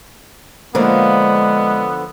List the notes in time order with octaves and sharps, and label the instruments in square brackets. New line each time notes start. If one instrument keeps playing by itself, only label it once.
[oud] D3 F3 [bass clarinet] G#3 [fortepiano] A#3 C5 [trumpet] B3